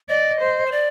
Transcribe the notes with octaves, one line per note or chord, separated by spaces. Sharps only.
D5 D#5
C5
C5
D5